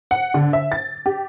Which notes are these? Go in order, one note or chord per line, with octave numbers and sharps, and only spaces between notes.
F#5
D3
E5
A6
G4